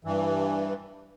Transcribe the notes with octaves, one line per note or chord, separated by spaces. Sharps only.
G2 E3